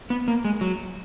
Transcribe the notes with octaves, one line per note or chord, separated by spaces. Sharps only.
B3
A#3
G#3
F#3